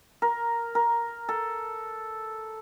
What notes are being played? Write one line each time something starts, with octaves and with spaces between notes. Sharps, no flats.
A#4
A#4
A4